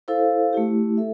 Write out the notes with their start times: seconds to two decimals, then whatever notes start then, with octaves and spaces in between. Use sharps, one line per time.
0.08 E4 A4 C5 F5
0.53 A3 E4 G4
0.97 A4 E5